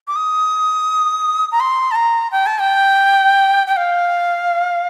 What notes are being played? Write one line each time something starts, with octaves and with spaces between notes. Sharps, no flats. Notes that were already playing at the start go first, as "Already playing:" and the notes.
D6
D#6
A#5
C6
A5
A#5
G5
A5
G5
G5
F5